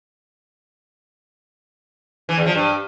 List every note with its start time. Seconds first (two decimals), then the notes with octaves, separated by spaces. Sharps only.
2.29 E3
2.37 E2
2.46 F3
2.55 G2